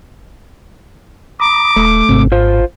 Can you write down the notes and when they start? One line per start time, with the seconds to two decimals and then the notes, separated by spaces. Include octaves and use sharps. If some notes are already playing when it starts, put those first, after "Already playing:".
1.40 A#5 B5 D6 D#6
1.76 D#1 A3
2.09 G#1 G#2 C3 C4
2.32 G#2 F4 C5